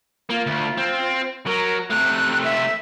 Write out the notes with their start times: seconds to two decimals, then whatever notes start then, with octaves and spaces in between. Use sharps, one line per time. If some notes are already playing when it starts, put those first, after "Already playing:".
0.30 A#3 F4
0.46 D2
0.77 C4
1.47 F#3 A#4
1.90 C3 A3 F#6
2.44 E5